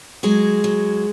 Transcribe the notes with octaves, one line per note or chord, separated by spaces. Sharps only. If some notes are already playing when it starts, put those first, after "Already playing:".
F#3 G#3 G#4
F#3